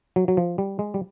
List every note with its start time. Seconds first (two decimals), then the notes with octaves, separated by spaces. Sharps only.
0.16 F#3
0.28 F#3
0.37 F3
0.58 G3
0.79 G#3
0.94 G3